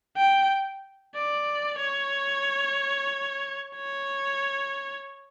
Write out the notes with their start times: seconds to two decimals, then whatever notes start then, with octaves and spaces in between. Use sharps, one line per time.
0.17 G5
1.15 D5
1.80 C#5
3.76 C#5